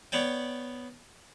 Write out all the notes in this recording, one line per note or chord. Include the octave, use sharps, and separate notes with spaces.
B3 C#5 D5 G5